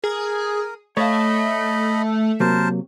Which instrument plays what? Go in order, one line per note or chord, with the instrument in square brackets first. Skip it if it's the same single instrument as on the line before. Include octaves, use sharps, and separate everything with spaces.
[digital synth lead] G#4 [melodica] A#4
[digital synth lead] A3 [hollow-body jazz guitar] C#5 F5 [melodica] D#5 B5
[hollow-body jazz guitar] C3 F#3 A#3 [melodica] A#4 C5 A5